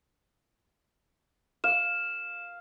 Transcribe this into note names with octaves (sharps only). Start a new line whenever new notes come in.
F5 E7